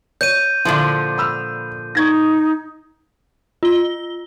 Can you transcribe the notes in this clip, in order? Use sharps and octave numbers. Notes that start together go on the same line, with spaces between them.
C#5 G6 D#7
A#2 D3 F3 E4
B5 E6 F6
D#4 C#6 G#6 A#6
F4 G7